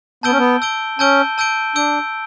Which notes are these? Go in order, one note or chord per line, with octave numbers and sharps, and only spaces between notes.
B3 A5 E6 G6 D7 G7
C#4
B3
A5 E6 G6 D7 G7
C#4 A5 E6 G6 D7 G7
A5 E6 G6 D7 G7
D4 E6 G6 D7 G7